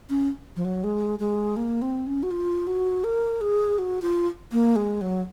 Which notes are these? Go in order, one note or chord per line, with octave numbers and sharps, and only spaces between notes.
C#4
F3
F#3
G#3
G#3
A#3
C4
C#4
F#4
F4
F#4
A#4
G#4
F#4
F4
A#3
G#3
F#3